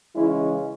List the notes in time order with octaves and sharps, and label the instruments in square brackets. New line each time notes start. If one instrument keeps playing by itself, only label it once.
[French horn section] C#3 E3 G#3 C#4 E4